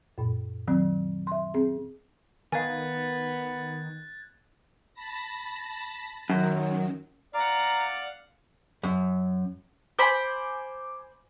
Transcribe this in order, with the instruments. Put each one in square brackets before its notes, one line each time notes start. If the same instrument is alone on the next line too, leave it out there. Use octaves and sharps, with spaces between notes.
[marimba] F#2 A#2
D#3 F#3 C4
E5 C6
C4 G#4
[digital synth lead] D#3 [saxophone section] B3 [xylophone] F5 G#5 [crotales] F#6 G#6 A6
[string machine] A5 B5 A#6
[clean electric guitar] F#2 [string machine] D#3 F#3
[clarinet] D5 [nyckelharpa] F5 F#5 [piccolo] A#5
[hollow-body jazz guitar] F#2
[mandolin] C5 B5 [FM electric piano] G#5 D6